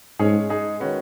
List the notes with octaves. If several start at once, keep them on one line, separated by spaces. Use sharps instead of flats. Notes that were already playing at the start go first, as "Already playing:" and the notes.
G#2 G#3 C#4 G#4 C#5
G#3 D#4 G#4
D#3 G#3 C#4 F#4 B4